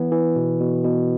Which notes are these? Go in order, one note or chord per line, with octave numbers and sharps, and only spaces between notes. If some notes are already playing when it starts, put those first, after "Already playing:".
Already playing: E3 B3
E3
B2
B2
B2